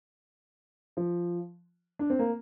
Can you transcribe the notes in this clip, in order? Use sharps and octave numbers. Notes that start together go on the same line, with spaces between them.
F3
D4
C4
A#3